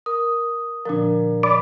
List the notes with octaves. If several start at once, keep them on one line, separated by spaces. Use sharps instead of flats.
A#4 D#6
A#2 D3 F3 D4 A#4
D5 B5